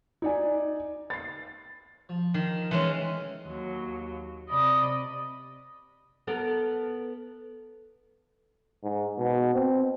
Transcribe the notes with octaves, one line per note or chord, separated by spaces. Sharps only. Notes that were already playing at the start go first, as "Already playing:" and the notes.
D#4 D5 G#5
A6 C7
F3
D#3
E3 G#3 C#4
D#2 F#3
C3 D5 D#5 B5 D#6
B3 A4 A#4
G#2
B2
C4